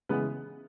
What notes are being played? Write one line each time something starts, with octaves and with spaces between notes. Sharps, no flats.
C#3 E3 G#3 B3 B4